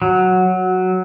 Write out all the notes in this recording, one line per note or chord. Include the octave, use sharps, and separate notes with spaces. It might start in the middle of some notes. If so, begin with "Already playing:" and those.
F#3